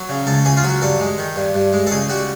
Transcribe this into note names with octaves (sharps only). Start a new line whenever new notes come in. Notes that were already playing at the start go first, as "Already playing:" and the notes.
Already playing: F#3
C#3
C#2 A4
C#2 G#4
F4
F#3 F#4
G2 A4
G#3
D#3
G2
G2
G#3
A4
C#2 G#4
G3 F#4